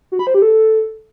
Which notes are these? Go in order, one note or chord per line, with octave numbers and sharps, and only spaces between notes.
F#4
B5
C5
G4
A4